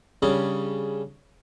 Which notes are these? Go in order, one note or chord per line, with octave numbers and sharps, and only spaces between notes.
C#3 G3 C#4 D4 G#4